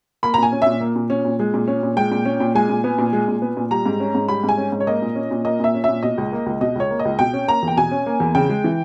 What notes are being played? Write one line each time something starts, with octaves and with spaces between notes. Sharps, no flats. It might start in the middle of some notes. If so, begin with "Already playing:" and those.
A#3 B5
A#5
A#2 G#5
C#4
A#2 E5
A#3
A#2
C#4
A#2
G#3
A#2
C#4
A#2
G#3 G5
A#2
C#4
A#2
G#3 G#5
A#2
B3
A#2
G#3
A#2
B3
A#2
G3 A#5
G#2
C#4
G#2
G3 B5
G#2
G#5
C#4
G#2
C#5
A#3 D#5
A#2
C#4
A#2
A#3 D#5
A#2 E5
C#4
A#2 E5
B2 D#5
C#2
A#3
C#2
B2 D#5
C#2 C#5
A#3
D#5
C#2
B2 G5
C#4
A#3 A#5
E2
G5
B2 G#5
C#4
A#3
E2
C#3 G5
G#3
E3